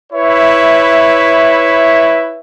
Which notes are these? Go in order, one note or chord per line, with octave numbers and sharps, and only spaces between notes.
E4 B4 C#5 E5